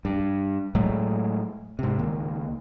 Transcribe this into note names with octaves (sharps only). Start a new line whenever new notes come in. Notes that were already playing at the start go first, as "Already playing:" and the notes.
G2
A2 F#3 G#3 A3
G#2 C3
C#2 D#3 A#3